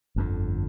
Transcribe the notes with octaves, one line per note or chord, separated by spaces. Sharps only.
G1 F2 D3